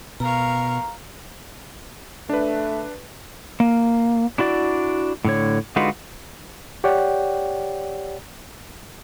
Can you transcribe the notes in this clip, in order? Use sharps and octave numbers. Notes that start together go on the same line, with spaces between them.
B2 A#4 F5 A#5 C#6
A3 D4 B4
A#3
D4 E4 F#4 D5
A2 D3 C#5
D3 G#3 D#4 F4 F#4 B4
G4 C#5 D5 F#5 G5